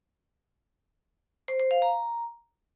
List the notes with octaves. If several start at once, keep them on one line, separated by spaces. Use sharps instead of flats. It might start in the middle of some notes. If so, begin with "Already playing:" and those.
C5
C5
F5
A#5